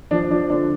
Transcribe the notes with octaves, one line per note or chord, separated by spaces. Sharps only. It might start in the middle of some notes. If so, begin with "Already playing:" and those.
F3 D4
F3 D4
D3 D4